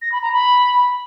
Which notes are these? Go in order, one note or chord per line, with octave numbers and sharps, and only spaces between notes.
A#6
B5
A#5
B5